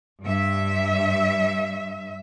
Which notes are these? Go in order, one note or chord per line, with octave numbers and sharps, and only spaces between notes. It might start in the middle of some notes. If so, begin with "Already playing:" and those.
G2 E5